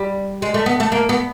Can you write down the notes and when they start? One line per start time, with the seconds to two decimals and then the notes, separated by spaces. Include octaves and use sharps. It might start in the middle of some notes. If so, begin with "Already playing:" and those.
Already playing: G3
0.42 G#3
0.54 A3
0.66 B3
0.80 A3
0.92 A#3
1.09 B3